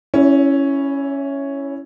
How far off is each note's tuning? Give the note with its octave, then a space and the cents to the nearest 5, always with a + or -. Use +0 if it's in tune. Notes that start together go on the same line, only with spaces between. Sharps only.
C#4 +0 E4 +0 C#5 +45